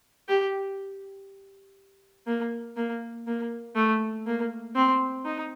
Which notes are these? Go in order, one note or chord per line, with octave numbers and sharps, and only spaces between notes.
G4
A#3
A#3
A#3
A3
A#3
C4
D#4